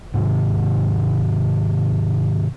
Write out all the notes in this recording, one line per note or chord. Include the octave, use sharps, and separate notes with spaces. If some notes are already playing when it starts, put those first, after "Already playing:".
G#2 C3 D#3